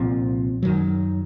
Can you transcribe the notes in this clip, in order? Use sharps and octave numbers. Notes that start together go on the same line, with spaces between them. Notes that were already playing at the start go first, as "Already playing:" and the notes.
Already playing: C2 A#2 F3 C4
F#2 D#3 F#3